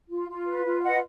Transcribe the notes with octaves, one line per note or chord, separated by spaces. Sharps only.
F4
F4
B4
F4
F5
B4 D#5 F#5